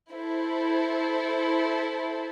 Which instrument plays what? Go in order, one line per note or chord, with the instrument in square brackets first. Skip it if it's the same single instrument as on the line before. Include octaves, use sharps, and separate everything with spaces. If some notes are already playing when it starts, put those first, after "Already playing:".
[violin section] E4 A4 C5